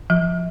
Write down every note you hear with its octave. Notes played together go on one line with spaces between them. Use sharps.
F3